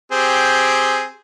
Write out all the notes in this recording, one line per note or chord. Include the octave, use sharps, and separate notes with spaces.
C4 G4 G#4